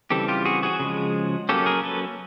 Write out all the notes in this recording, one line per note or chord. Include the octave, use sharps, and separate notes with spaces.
C#3 E3 G3 C4 G4 A4
F4 G4
F#4 G#4
F#4 G#4
C#3 F3 G#3
F#3 A#3 C#4 G4 A4
G#4 A#4
A4 B4